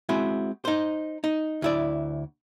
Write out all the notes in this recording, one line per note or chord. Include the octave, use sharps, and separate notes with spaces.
G#3 C4 E4 F#4
D#4 C5
D#4
D2 E4 D5